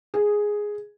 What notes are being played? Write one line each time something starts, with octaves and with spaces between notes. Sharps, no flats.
G#4